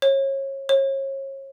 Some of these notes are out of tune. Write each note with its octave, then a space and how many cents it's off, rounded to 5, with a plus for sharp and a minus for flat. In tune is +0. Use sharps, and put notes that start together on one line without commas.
C#5 -30
C#5 -35